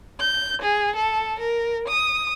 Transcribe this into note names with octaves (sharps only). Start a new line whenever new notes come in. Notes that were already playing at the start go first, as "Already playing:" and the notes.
G6
G#4
A4
A#4
D#6